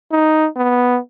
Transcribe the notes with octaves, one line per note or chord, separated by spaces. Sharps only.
D#4
B3